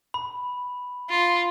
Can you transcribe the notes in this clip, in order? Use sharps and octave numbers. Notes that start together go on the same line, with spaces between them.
B5
F4